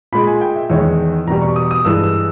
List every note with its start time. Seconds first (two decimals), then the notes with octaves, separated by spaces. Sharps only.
0.13 A#2 G#3 B5
0.27 G#5
0.41 G5
0.56 E5
0.70 E2 D#3 G#3 C#5
1.27 E2 B2 G3 A#5
1.42 C#6
1.56 D#6
1.71 D#6
1.85 G2 E3 G#3 E6
2.04 E6